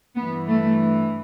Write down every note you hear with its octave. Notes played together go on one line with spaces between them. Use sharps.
G2 E3 B3
A3